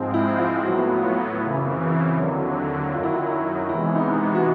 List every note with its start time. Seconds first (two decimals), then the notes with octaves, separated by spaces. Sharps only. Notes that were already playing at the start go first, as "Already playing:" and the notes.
Already playing: G#2 F3 G#3 C4
0.14 E4
0.39 F4
0.64 A2 F#3 B3 F#4
1.03 F4
1.41 F#2 C#3 E3 E4
1.66 C4
1.91 E4
2.16 D#2 D3 F#3
2.93 F#2 D#3 F#3 F4
3.03 E4
3.14 F4
3.31 E4
3.69 C3 E3 G#3 B3 E4
3.95 D#4
4.35 F#4